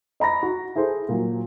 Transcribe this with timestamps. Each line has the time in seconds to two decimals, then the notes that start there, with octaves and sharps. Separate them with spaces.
0.20 D#5 A#5 B5 A#6
0.43 F#4
0.76 E4 G#4 A4 C5
1.09 A#2 F#3